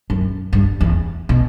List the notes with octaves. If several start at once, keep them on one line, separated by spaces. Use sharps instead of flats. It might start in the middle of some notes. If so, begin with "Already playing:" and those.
F#2
G2
E2
B2